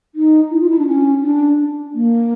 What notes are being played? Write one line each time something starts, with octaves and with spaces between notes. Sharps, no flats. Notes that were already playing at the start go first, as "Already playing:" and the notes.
D#4
E4
F4
E4
D4
C#4
D4
A#3